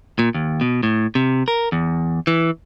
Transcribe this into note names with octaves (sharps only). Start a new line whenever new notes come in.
A#2
D#2
B2
A2
C3
A#4
E2
E3